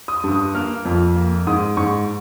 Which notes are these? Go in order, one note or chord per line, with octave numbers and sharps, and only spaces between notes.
D#6
G2
D#6
A#3 F6
F2
A#3
G#2 D#6
G#2 C#6